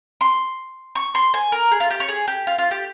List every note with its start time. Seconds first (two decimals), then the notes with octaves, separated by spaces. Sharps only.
0.21 C6
0.95 C#6
1.15 C6
1.34 G#5
1.52 A#4
1.72 G#4
1.80 F4
1.90 G4
2.00 C#5
2.09 G#4
2.28 G4
2.47 F4
2.58 F4
2.71 G4